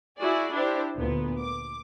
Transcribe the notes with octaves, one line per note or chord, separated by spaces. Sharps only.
E4 F#4 G#4 D5
D4 E4 G4 C5
D2 A#2 B3
D6